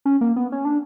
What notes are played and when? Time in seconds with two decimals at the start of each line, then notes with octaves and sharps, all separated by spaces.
0.05 C#4
0.21 A#3
0.36 B3
0.52 C#4
0.65 D4